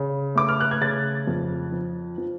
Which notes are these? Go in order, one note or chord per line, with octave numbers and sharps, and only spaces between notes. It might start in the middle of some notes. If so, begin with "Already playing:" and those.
Already playing: C#3
A3 D6
F6
F#6
G#6
C#3 A6
F2
F3
F3